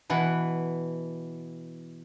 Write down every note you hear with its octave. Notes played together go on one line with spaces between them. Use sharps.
B2 E3 F#5